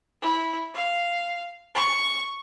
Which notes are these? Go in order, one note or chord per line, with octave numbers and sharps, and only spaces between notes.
E4
F5
C#6